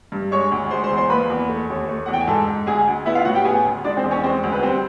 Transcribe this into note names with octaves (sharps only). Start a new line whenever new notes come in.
G2
G#3 C#5 C#6
D2
G#3 C5 C6
C5 C6
E2
C5 C6
A#3 B4 B5
E2
A3
D#2
A3
E2 F#5
G5
G#5
G#2 A4 A5
G#2
D2 G#4 G#5
D2
B3 E4 E5
F4 F5
A2 F#4 F#5
G4 G5
B3 G#4 G#5
D2
G#3 D4 D5
C4 C5
E2
C#4 C#5
G#3 C4 C5
D2
B4
G3 C4 C5